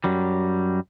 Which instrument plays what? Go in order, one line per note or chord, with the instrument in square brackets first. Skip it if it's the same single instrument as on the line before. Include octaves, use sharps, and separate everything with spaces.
[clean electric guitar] F#2 F#3 G3